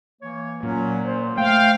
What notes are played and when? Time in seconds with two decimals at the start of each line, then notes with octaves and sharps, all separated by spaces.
0.21 E3 A#3 C#5
0.63 A#2 F#3 C#4
1.06 C5
1.38 A3 F5 G5